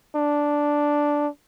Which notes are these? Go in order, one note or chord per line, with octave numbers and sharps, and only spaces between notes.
D4